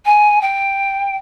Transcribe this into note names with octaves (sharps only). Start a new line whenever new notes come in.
G#5
G5